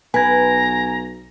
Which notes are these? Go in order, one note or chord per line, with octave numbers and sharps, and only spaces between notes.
B1 B4 G#5 A#5 G#6